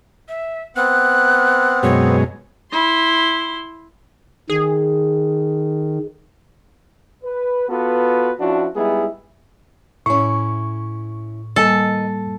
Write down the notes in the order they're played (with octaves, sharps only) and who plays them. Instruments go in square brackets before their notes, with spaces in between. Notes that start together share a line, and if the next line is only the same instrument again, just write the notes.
[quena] E5
[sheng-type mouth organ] B3 C4 [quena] F#6
[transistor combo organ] F#2 B2 G#3 [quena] C#5
[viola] E4 C6
[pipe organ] D#3 [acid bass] G#4
[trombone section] B4
B3 F4 F#4 A4 B4
F3 C#4 D4 E4 F#4
G3 G#3 B3 D#4 E4 G#4
[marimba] A2 [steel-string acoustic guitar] C#4 E4 [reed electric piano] C#6
[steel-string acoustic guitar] D#3 D#5 G#5 [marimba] G3 A#3 [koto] A4